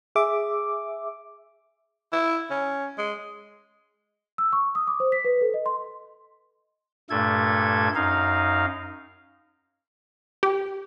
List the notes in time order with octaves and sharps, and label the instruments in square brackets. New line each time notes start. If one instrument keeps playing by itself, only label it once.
[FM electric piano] G#4 E5 D6
[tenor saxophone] E4
C#4
G#3
[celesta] E6
C#6
D#6
D6
C5
B6
B4
A4
D#5
C6
[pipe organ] G2 A#2 A3 A4 G#6
F#2 D#4 F5
[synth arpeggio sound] G4